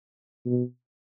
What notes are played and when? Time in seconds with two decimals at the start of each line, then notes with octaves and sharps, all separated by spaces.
0.46 B2